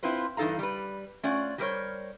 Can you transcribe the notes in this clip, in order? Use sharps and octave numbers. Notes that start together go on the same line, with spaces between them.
C4 E4 F4 B4 C5
G2 E3 D#4 A4 F5 A#5
G3 B4
A3 C#4 F4 D5 F#5
F#3 G3 A3 A#4 C5 C#5